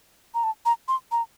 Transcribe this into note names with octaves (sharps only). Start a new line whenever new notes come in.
A#5
A5
A#5
C6
A#5